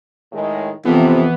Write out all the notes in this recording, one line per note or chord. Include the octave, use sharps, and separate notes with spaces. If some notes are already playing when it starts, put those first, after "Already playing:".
A2 D#3 G#3
F2 C3 E3 B3